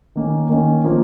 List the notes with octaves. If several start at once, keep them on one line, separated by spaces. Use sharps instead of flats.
D#3 A#3 C#4
D#3 A#3 C#4
F3 A#3